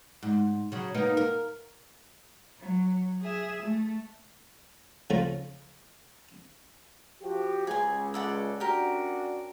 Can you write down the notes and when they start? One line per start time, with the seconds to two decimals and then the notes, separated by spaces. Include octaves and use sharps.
0.23 G#2
0.72 C#3 F#3
0.94 A#3 B3 D#4
1.17 A#4
2.60 F#3
3.22 G#4 E5
3.63 A3
5.10 C#3 F3 A3 F4 A#4
7.22 F3 F#4 G4
7.67 C#2 G#4 G#5
8.14 A4 D5 F#5
8.60 C#4 D4 F#4 G4 A#4